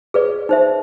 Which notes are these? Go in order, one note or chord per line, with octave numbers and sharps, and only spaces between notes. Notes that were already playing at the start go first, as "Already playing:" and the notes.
G#4 B4 D5
D#4 C5 E5